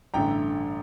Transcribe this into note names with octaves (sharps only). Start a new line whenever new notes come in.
A1 G2 D3 A3 G5 A#5